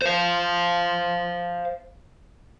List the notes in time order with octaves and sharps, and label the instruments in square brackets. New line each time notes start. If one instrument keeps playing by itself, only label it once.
[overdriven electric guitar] C5 F5